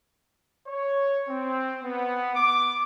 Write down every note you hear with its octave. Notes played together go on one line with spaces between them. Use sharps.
C#5
C4
B3
D6